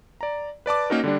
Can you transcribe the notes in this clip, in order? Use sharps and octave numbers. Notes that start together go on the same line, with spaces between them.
D5 A#5
B4 D5 A5 D6
A#3 C#4 D#4 F#4 A#4
D3 G3 D4